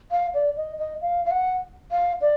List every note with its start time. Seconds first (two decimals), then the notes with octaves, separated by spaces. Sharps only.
0.11 F5
0.34 D5
0.57 D#5
0.79 D#5
1.01 F5
1.25 F5
1.31 F#5
1.92 F5
2.21 D5